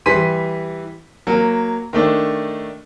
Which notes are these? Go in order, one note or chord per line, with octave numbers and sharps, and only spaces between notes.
E3 G3 C6 B6 D#7
F#3 A#3
D#3 A3 D4